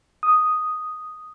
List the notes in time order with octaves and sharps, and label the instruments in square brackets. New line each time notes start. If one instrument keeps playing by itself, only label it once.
[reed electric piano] D#6